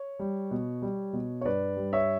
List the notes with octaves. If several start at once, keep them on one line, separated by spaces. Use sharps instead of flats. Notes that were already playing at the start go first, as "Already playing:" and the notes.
Already playing: C#5
G3
B2
G3
B2
C#5
G2 B4 D5
G3
C#5 E5